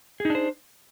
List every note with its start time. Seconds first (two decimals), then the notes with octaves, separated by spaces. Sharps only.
0.20 G#4
0.25 D#4
0.30 D4
0.35 C5